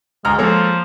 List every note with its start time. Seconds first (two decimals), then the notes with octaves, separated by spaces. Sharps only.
0.25 D2 G#3 A#5 F6
0.39 F3 G#3 A#3 A4 C#5